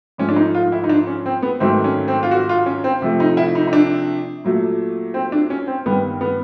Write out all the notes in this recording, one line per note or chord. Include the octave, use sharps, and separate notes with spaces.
G#2 F3 A3 C#4
D4
D#4
F4
E4
D#4
D4
C#4
C4
B3
G#2 D#3 F#3 A3 C4
C#4
C4
F4
F#4
F4
C#4
C4
C3 F3 A3
D#4
E4
D#4
D#4
D4
A#2 F#3 A3
C4
D4
C#4
C4
G2 D#3 G3 B3
B3